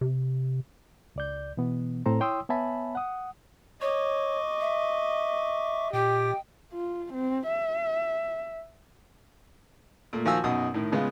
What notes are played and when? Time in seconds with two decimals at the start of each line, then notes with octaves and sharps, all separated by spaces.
0.01 C3
1.16 C#2 D5 G6
1.57 B2 E3 B3
2.06 A2 C4 A4 C5 A#5
2.20 E4 C#5 G5 C6 D#6 E6
2.49 B3 C#5 E5 G#5 A5 B5
2.95 F#5 D#6
3.82 C#5 D#5 C#6 D6
4.61 E5
5.93 A#2 G4 G5
6.73 F4
7.13 C4
7.47 E5
10.13 A#2 A3
10.25 D#3 F3 F#4 F5 G#5 E6
10.44 F#2 B2 D#4 D#6
10.74 A2 D#3
10.92 C#3 G#3 B3 F4